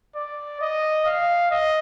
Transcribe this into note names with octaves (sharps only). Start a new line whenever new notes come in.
D5
D#5
F5
D#5